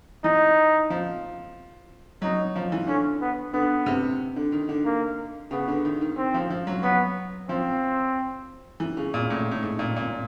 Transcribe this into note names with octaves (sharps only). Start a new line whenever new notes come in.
E3 D#4
F3
F#3 D#4
F3
E3
D3 C#4
B3
D3 B3
C3
D3
D#3
D3
A#3
C#3 B3
D3
D#3
D#3
C4
F3
F3
F#3
F#3 B3
F3 C4
E3
C#3
A#2
A2
A2
G#2
A#2
A#2